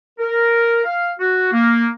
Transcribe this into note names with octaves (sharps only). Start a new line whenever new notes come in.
A#4
F5
F#4
A#3